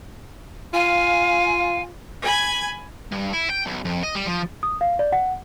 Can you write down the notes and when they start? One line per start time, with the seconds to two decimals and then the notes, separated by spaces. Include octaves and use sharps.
0.74 F4 F5 G#5
2.23 G#5 B5 G#6
3.12 G2
3.33 E4
3.50 G5
3.66 B1
3.85 F2
4.03 D#5
4.15 G3
4.26 F3
4.63 D#6
4.81 F5
4.99 D5
5.12 F#5